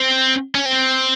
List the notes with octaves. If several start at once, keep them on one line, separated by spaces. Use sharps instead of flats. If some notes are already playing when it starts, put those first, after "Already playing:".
Already playing: C4
C#4
C4